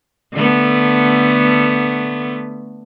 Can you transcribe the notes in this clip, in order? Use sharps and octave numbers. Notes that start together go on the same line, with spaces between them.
D3 A3 B3